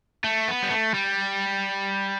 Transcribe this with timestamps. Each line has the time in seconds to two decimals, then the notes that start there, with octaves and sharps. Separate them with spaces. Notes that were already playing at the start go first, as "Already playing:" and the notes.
0.24 A3
0.48 B3
0.63 G3
0.71 A3
0.94 G3